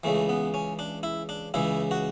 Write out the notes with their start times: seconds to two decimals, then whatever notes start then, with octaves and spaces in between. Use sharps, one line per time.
0.04 C#2 C#3 E3 A3
0.29 B3
0.54 C#4
0.79 D4
1.03 E4
1.29 D4
1.54 C#2 C#3 E3 E4
1.91 F#4